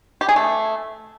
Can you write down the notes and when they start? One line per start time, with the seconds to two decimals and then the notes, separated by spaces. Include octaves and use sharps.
0.21 G4
0.29 G#4
0.36 A3